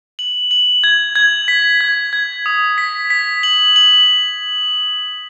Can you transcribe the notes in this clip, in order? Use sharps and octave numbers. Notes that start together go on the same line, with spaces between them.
F#7
F#7
G#6
G#6
B6
G#6
G#6
D#6
B6
B6
F#7
F#7